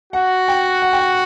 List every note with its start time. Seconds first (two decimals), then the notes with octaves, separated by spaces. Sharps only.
0.13 F#4 F#5
0.48 G5
0.82 F#5
0.93 G5
0.99 F#5